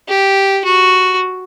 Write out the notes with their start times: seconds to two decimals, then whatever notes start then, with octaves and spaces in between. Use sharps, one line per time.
0.08 G4
0.64 F#4